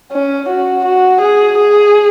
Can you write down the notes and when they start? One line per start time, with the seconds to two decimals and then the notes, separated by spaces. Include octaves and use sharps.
0.12 C#4
0.49 F#4
0.85 F#4
1.22 G#4
1.58 G#4